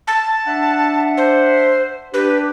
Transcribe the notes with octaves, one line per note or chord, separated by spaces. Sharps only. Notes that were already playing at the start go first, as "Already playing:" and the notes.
A5
D4 E5 F#5
C5
D4 G4 B4